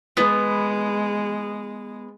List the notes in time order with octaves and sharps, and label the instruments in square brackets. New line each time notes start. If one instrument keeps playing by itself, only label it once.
[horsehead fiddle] G#3 [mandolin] B3